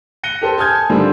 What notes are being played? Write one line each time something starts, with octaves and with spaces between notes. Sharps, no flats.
F#6 A#6 C#7 D#7 G7
G4 A4 C5 A5
G#5 A5 D#6 F6 G6 G#6
G#5
D3 D#3 F3 G3 C4